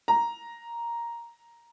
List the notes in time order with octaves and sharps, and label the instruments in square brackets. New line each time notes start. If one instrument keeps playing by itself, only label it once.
[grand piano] A#5